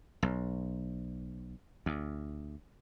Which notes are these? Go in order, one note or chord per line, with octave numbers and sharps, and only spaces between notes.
B1
D2